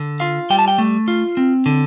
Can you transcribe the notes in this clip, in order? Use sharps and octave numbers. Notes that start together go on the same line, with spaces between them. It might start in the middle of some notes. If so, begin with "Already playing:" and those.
Already playing: D3
F4 F5
G3 G5
A5
G5
A3
F4
C4
D3